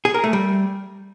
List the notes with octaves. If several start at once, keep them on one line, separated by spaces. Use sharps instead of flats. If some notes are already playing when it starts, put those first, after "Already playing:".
G#4
A#4
A3
G3